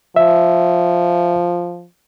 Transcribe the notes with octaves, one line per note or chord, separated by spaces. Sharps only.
F3 E5